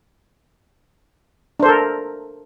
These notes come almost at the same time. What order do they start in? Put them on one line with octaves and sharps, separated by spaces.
D4 C5 A4 A#4